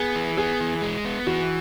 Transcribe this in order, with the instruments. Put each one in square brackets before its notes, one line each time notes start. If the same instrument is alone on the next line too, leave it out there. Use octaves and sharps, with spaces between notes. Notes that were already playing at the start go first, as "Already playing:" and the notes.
Already playing: [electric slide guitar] B3 [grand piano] G#4
[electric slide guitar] E3
[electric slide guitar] B3 [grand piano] G#4
[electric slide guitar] E3
G#3
B3
[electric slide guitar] E3 [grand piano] F#4